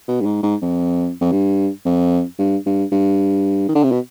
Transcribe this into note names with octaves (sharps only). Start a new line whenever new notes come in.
B2
G2
G#2
G#2
F2
F2
G2
F2
G2
G2
G2
D#3
D3
C3
B2